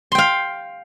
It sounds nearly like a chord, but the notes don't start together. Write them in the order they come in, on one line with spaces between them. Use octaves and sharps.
C6 G5 F5